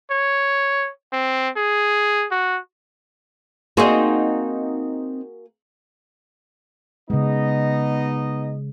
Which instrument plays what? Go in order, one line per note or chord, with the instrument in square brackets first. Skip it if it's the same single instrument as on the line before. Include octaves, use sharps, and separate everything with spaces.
[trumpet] C#5
C4
G#4
F#4
[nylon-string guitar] A#3 F#4 G#4 [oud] C4 D#4 D#5
[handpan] C#3 G#3 [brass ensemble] B3 D#4 D#5